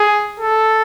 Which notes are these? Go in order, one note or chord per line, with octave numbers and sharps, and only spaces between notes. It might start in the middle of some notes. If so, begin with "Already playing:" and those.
Already playing: G#4
A4